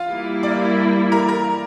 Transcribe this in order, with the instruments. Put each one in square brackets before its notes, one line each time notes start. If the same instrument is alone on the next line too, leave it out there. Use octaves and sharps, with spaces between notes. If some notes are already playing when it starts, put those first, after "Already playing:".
Already playing: [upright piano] F4 F5
[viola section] G3 A#3 E4
[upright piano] D5 D6
A#4 A#5
A#4 A#5